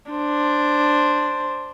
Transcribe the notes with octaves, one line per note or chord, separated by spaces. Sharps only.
D4 C5